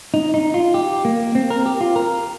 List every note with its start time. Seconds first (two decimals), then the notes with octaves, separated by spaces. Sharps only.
0.14 D#4
0.34 D#4
0.54 F4
0.74 G4
1.05 A#3
1.35 C4
1.50 A#4
1.66 G4
1.81 F4
1.96 A#4